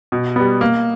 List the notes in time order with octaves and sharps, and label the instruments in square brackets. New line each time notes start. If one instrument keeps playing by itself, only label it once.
[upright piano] B2
G3 B3
A#3